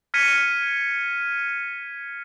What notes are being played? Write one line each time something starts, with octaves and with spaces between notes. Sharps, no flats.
F6 G#6 A#6 B6 C#7 D#7